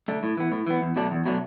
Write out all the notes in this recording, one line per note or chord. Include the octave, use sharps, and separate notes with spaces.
D3 A3
A2
E3 B3
A2
E3 B3
E2
B2 F#3 A3 D4
E2
B2 F#3 A3 D4